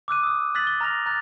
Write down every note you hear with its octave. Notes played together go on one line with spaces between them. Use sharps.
D6 E6 F#6 D#7
D#6 E6
E6 F#6 A6 B6 F#7
G7
A#5 F6 A#6 F7
A#5 F#6 A6